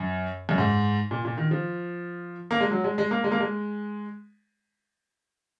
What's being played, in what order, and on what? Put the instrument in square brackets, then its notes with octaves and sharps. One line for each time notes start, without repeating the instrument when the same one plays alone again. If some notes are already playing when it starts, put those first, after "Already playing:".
Already playing: [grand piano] F#2
F#2
G#2
A#2
A#2
D#3
F3
A#3
G#3
F#3
G#3
G#3
A#3
G#3
A#3
G#3